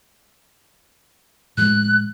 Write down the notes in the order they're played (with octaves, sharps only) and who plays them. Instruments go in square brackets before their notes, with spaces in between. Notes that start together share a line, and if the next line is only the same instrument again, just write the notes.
[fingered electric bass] A2 F3 G#3 [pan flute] F#6